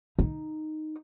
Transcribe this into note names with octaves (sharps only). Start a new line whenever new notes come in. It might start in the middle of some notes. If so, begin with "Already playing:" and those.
D#4